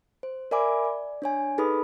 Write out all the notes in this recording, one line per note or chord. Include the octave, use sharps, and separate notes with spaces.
C5
A#4 D5 E5 G#5 B5 D6
D5
D4 C#5 G#5
D#4 G#4 A4 B4 B5 D#6